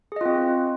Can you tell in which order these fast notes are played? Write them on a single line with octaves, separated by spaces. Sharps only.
G#4 D#5 F4 C4